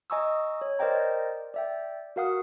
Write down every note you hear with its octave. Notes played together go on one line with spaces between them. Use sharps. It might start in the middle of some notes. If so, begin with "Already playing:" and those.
D#5 G#5 A#5 C#6 D#6 E6
C#5
A#4 C5 D5 D#5 G5 A#5
D5 E5 G5
F#4 A#4 F5 F#5 D#6